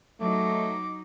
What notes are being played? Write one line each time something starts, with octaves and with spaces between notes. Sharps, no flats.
F#3 A3 D#4 D6